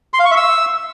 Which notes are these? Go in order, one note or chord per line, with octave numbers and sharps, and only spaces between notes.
C6
F5
C#6
E5
E6